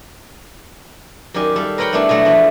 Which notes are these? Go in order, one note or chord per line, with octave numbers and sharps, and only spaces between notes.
F#2 D#3 G4 D5 G#5
G3 A4 F5
A#4 B4 C#5 F#5 G5 B5
G3 A3 B3 D4 E4
B2 F#3 A3
E2 F3 D4 F#4